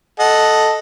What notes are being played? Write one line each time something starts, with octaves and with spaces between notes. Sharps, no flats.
A4 D#5 F#5